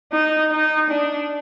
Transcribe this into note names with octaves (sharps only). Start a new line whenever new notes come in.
D#4
D#4
D4